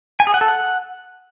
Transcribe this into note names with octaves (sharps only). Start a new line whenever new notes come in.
G#5
G#4
F#5
A4
F#5